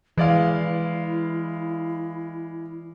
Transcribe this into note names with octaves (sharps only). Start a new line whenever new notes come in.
E3 G#3 E4 D5 F5